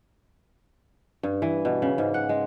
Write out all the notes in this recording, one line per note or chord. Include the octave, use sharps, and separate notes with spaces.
G2
E3
B2
C#3
G#2
F#5
G#3